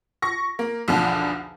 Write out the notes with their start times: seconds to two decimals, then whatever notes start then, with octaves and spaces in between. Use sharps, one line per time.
0.22 C#6 A#6
0.59 A#3
0.88 B1 E2 D3 F3